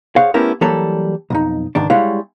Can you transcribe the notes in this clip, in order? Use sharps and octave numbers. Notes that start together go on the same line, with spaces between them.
G#4 C5 C#5 F5 F#5
A3 B3 C#4 E4 G4 A#4
E3 F#3 G3 A#3 A4 C#5
B1 F2 D#4
C#2 G#2 D#3 D4
G3 G#3 E4 C#5 F5 F#5